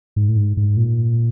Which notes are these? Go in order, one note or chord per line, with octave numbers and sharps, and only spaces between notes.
G#2
A2
G#2
G#2
A#2